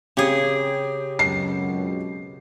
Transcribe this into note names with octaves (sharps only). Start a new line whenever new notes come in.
C#3 C4 G4 G#4
C#2 F#2 B2 C7